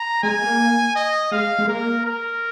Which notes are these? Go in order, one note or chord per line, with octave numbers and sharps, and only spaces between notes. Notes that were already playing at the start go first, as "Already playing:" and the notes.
Already playing: A#5
G#3 G#5
A#3
D#5
G#3 F5
G#3
A#3 A#4
A#4